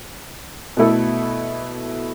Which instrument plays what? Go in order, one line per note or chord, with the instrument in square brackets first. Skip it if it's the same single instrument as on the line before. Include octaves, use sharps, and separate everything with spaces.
[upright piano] B2 A3 E4 A4